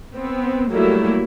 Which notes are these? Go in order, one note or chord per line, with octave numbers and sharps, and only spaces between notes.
B3 C4
F#3 G3 A3 A#3 E4